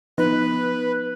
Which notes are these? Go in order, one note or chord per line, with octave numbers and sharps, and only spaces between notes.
F3 B3 D#4 B4